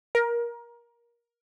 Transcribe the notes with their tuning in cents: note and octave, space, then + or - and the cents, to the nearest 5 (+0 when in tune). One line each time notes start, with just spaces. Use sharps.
A#4 +20